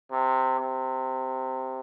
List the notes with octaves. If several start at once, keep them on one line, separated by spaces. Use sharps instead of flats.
C3
C3